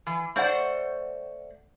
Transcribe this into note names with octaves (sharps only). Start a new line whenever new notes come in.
E3
A3 C5 D5 F#5